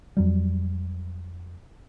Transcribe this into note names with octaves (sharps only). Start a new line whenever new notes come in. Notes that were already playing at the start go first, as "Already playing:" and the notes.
F2 F#3 G3